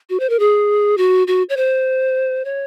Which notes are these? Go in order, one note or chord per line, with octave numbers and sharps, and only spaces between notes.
F#4
C5
A#4
G#4
F#4
F#4
C#5
C5
C#5